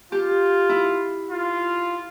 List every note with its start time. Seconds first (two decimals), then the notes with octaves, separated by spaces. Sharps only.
0.12 F4 G4
0.69 E4
1.30 F4